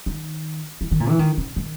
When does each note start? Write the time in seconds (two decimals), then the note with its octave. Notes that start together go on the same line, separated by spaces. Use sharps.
0.06 D#3
0.81 E3
0.91 D#3
1.00 A#2
1.09 E3
1.19 D#3
1.37 C#3
1.56 D#3